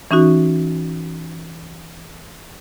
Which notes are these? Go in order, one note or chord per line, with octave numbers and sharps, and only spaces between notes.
E3 C#4 D#4 F#4